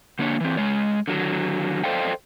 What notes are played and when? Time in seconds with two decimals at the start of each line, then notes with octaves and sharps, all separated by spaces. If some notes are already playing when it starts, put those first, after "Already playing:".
0.19 D3 A#3 D4 C#5
0.40 E3 C4
0.57 G#3 C#5
1.07 D3 D#3 F#3
1.84 A4 C5 D5 D#5 F5 G5